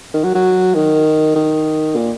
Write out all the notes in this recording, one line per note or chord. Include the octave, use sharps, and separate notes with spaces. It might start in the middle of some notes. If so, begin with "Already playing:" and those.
D#3
F#3
F#3
D#3
D#3
A#2